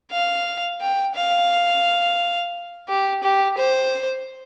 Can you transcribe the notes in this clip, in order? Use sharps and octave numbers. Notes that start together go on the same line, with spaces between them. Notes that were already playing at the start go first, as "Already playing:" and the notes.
F5
G5
F5
G4
G4
C5